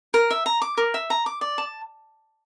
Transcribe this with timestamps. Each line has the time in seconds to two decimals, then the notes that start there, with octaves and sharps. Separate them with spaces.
0.14 A#4
0.30 E5
0.46 A#5
0.62 D6
0.77 A#4
0.94 E5
1.10 A#5
1.26 D6
1.41 D5
1.58 A5